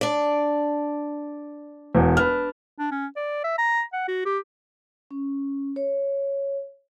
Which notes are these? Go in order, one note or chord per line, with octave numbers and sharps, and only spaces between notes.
D4 D5
E1 E2
D4 B4 F6
D4
C#4
D5
E5
A#5
F#5
F#4
G4
C#4
C#5